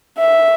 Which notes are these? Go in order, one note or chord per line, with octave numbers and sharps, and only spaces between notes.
E5